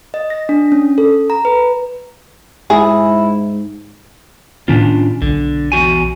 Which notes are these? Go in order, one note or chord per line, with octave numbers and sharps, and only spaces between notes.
D#5
A#6
D4
C#4
A4
A#5
B4
G#2 E4 G#4
A2 D#3 B3 C#4 D4 F4
B1 D3
E2 F#4 G#5